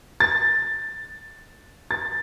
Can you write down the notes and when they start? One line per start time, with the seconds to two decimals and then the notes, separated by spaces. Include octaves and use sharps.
0.20 A6
1.91 A6